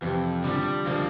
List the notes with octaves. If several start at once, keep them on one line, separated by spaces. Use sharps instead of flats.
F2 C3 E3
D3 F3 G3
D3 F3 A#3